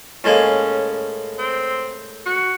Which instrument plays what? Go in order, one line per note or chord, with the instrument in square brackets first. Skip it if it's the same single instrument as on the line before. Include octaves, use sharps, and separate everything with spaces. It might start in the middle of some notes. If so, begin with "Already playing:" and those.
[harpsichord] A2 G#3 A#3 [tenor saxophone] C#4
[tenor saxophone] C4
F#4